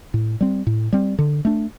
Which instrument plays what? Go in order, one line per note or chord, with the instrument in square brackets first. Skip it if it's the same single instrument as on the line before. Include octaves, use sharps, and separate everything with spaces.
[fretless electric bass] A2
G3 C4
A2
G3 C4
D3
A3 D4